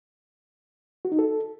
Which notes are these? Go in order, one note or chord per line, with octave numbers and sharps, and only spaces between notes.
F#4
D#4
A4